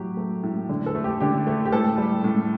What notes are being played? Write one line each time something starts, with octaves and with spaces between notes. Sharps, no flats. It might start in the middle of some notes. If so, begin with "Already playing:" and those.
Already playing: A2 F#3 G4
A3
A2
D3
A4
A3
G4
D3 G4
A3
G4
A2 A4
G3
A2